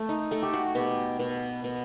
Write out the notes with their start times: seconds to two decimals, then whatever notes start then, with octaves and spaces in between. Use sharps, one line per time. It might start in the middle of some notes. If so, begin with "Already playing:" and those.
Already playing: A3
0.09 D#4
0.31 A3 A4
0.43 G4
0.53 F#4
0.75 B2 G4
1.19 B2
1.64 B2